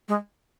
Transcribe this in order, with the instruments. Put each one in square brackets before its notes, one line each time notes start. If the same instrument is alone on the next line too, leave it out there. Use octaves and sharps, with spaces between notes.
[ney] G#3